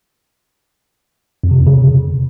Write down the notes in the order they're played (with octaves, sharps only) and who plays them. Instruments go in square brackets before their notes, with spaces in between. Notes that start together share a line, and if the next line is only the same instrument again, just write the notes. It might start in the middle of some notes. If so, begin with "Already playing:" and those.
[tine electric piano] F2
C3
E2
C#3
C3